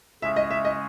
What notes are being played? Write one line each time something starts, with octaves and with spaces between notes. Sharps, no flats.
C#3 G#3 C#4 G#4 E5
D#5
E5
D#5